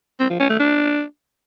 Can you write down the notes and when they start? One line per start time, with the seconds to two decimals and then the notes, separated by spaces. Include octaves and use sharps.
0.20 C4
0.30 F3
0.40 C#4
0.50 A3
0.59 D4